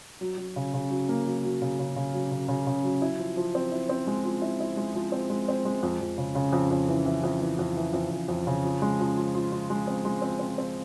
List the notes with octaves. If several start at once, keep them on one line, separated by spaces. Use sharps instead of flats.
F#3
F#3
C#3
C#3
F#3
A#3
F#3
F#3
C#3
C#3
C#3
F#3
C#3
C#3
C#3
F#3
E4
F3
F3
C4
E4
C4
G#3
F3
E4
E4
G#3
F3
C4
G#3
C4
G#3
F2
F2
C#3
C#3
F2
F2
E3
E3
F2
E3
F2
E3
F2
F2
F2
C#3
F3
G#3
F3
F4
F4
F4
G#3
C4
G#3
C4
C4
C4